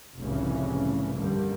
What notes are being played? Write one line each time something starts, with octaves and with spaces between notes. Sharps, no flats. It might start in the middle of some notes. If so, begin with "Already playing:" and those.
F1 C2 A2 C#3 E3 C#4
G2 D3 G3 A#3